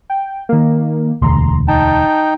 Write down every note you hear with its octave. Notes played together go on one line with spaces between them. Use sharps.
G5
D#3 A#3
E1 D2 A#5 C6
D#4 G5 A5